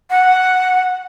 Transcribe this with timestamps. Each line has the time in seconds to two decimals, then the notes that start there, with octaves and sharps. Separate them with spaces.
0.10 F#5